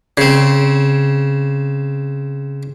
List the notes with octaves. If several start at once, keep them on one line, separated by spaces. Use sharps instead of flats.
C#3 C4